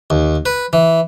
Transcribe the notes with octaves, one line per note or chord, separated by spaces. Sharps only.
D#2
B4
E3